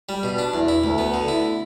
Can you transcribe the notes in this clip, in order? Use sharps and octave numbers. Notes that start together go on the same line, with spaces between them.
G3
B2
D4
E2
E4
D2
B3
D3
E4